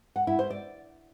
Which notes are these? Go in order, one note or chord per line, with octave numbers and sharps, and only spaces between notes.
F#5
E4
C5
D5